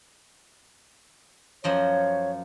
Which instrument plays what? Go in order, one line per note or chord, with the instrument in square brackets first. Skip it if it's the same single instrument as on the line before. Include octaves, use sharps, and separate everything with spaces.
[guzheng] F#2 F3 D#5 [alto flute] C#5